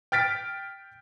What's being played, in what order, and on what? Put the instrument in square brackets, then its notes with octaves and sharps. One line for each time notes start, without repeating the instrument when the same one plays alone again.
[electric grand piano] G5 F6 A6 B6 D7